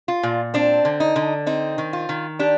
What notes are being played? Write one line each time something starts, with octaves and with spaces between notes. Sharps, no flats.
F4
A#2
C4 D4
D3
D#4
D3
C4 D#4
D#3
F4
D#3
D4 G4